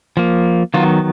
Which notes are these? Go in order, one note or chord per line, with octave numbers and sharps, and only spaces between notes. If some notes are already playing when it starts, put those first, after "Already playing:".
F3 A#3
D#3 F#3 B3 F4